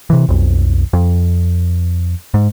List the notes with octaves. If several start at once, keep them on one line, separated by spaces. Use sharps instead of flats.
C3 E3
B1 F2
F2
G#2